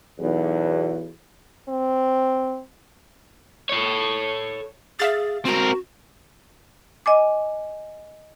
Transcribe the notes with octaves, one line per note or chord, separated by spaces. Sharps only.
B1 E2
C4
A4 C#5
G#4 E5 F5 A6
C4 F#4 A#4
D#5 G#5 D6